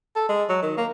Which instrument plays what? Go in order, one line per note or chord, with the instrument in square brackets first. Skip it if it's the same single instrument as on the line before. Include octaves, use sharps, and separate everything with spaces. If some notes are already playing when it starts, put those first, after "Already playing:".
[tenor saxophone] A4
G#3
F#3
D#3
A#3